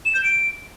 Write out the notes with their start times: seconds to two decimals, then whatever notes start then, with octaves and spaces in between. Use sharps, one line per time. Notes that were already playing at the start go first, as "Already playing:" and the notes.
0.05 E7
0.14 G6
0.23 D7